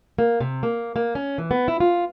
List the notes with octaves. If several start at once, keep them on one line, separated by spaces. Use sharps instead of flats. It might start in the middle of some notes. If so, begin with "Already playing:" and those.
A#3
C3
A#3
A#3
C#4
E3
B3
E4
F4